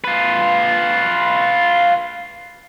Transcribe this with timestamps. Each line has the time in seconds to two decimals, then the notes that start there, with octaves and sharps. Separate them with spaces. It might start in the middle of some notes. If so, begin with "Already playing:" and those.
0.04 F4 B4